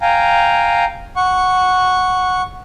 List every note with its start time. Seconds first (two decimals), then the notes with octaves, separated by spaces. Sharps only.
0.01 F5 G5 G#5 A#5
1.16 F#5 C#6